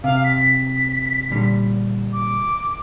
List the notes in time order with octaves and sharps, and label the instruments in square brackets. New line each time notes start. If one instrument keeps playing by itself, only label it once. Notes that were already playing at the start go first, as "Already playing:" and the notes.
[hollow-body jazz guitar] C3 [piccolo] F5
[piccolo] B6
[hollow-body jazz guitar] A#2 D3 G3
[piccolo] D6